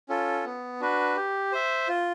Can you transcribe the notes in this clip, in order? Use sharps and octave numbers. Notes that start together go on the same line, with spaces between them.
C#4 F4 A4
B3
D4 F#4 B4
G4
C5 E5
F4